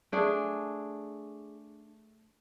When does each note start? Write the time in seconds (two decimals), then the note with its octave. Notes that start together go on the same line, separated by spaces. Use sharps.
0.12 A3 D4 G#4